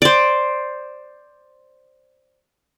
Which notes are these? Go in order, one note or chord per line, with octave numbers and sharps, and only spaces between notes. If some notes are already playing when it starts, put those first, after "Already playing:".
C5 D5